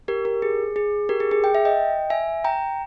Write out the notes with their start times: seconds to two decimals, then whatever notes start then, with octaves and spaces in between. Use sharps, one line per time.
0.08 G4 A#4
0.25 G4 A#4
0.42 G#4
0.76 G#4
1.09 G4 A#4
1.20 G#4
1.31 G#4
1.44 G5
1.55 E5
1.65 D#5 G5
2.10 E5 G#5
2.44 G5 A#5